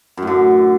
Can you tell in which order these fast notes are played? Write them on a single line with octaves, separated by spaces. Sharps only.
F#2 A2 D3